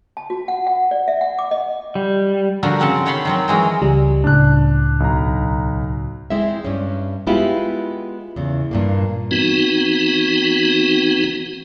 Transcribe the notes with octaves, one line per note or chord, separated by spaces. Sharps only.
A5
F#4
F#5
F#5
D5
E5
F#5
D6
D#5
G3
D3 F3 F#4 A#4
C#3 C4 F#5 A5
D#3 C#5 A5 B5 C6
D#3 F#3 C4
E3 G#3 F#4 A#4
C#2 G3
C#2 A2 D4 F#6
B1 A#5
G#3 C4 E4 E5
G2 C#4
G#3 B3 E4 F4 G4
E2 C#3
G2 A#2 A#3
E3 B3 C4 D#4 F#4